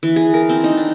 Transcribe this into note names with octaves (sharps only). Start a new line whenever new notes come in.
E3
G#4
A#4
C4
D#4
D4